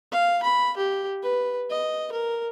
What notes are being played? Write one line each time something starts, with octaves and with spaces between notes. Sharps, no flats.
F5
B5
G4
B4
D#5
A#4